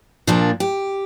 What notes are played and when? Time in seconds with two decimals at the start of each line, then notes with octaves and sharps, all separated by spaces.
0.27 A#2 F3 A#3 D4
0.60 G4